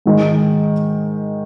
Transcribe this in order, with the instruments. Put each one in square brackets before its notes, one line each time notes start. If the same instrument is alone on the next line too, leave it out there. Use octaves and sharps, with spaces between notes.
[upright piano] G#2 D#3 G#3 D#4